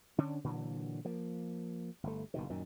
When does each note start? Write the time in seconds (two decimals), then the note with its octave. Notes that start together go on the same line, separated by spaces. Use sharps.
0.18 D3 C#4 D4
0.44 A#2 D3 E3 F#3
1.05 F3 A#3
2.03 G1 A3
2.34 F#1 B2 D#3
2.50 F#2 A#2 D#3